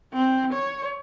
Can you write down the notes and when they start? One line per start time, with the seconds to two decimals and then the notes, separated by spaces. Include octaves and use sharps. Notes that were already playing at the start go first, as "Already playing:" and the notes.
0.13 C4
0.53 C#5